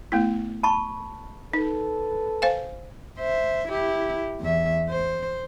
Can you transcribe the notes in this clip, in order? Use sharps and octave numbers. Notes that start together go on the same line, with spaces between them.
A3 B3 E4
A5 B5 C#6
D#4 A4 B4
C5 F5 G#5
C5 E5
E4 G4
E2 E5
C5